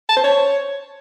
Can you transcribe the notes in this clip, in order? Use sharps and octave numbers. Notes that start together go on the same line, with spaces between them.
A5
C5
C#5